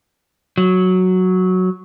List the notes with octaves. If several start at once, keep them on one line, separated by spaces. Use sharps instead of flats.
F#3